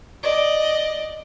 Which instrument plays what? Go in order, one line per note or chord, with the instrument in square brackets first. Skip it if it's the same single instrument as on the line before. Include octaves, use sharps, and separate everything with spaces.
[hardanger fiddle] D5 D#5